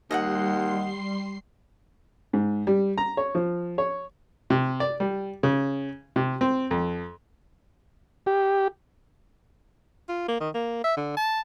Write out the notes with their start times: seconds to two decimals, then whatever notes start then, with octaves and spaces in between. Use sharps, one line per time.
0.11 D#2 G3 D#5 F5 F#5 C6 C7
2.33 G#2
2.67 G3
2.98 A#5
3.17 C#5
3.35 F3
3.78 C#5
4.50 C3
4.80 D5
5.00 G3
5.43 C#3
6.16 C3
6.41 C4
6.71 F2
8.26 G4
10.09 F4
10.28 A#3
10.40 D#3
10.54 A#3
10.84 E5
10.97 D3
11.17 A5